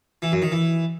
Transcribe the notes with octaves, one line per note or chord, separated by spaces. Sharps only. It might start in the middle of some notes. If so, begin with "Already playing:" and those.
E3
F#2
D#3
E3